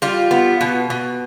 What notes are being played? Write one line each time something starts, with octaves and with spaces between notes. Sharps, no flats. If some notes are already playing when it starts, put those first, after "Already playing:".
G3 F4
B3
B2
B2